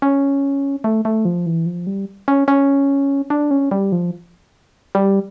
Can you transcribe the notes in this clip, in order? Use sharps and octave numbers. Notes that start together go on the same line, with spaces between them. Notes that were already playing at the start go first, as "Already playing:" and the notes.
C#4
A3
A3
F3
E3
F3
G3
C#4
C#4
D4
C#4
G3
F3
G3